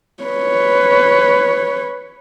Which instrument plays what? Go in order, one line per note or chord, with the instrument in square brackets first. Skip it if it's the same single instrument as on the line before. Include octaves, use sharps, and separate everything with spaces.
[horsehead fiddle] B4 C#5